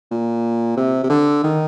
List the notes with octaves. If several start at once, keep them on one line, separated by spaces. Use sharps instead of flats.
A#2
C3
C3
D3
D#3